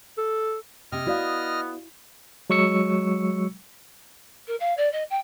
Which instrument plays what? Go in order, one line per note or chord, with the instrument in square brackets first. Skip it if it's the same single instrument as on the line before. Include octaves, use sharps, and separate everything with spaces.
[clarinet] A4
[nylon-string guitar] C3 [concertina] D#5 F6
[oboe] B3 [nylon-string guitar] E4 [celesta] F#4 D5 F5
[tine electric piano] F#3 G#3 C#6 E6 C#7
[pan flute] A#4
F5
D5
D#5
G5